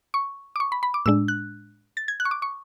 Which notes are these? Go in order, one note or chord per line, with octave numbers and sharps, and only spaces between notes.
C#6
D6
C#6
B5
B5
D6
A2 G#3 D4 E6
F#6
A6
G#6
F#6
C#6
D6
C#6